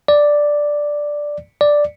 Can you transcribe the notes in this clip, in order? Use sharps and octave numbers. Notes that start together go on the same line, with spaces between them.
D5
D5